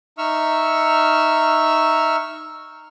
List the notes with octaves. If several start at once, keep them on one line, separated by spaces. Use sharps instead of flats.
D#4 E5 C#6 E6 F6